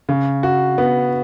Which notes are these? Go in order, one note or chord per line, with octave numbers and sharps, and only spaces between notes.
C#3
F#4
B3